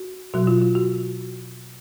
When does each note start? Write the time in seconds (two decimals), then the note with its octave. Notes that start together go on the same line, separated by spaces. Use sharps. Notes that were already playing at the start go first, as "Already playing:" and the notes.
Already playing: F#4
0.34 B2 F#3 F#4
0.47 F4
0.61 F4
0.75 F#4